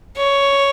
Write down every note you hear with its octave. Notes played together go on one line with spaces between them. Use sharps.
C#5